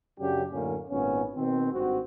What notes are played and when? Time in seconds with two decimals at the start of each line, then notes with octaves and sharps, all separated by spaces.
0.19 F#2 C#3 F#3 D4 G4
0.51 F#2 A2 D3 A#3 C#4
0.90 G#1 A#2 B3 C#4
1.36 B2 D#3 C4
1.73 G#1 G2 C4 F#4